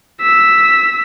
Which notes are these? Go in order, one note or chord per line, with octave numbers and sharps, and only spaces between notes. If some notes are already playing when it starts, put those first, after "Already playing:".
E6 B6